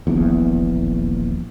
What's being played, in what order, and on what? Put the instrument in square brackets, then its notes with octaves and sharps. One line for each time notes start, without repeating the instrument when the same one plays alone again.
[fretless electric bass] D#1 A#1 E2